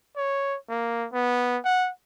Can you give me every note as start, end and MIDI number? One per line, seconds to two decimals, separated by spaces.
0.17 0.57 73
0.69 1.07 58
1.13 1.58 59
1.65 1.90 78